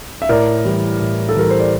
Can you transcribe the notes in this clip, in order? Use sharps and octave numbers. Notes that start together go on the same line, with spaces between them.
E5
A2 A#4 D5
E3 G3
A2
A4
E3 G3 A#4
C5
D5